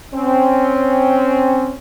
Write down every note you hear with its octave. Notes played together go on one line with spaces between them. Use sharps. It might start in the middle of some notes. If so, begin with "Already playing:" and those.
C4 C#4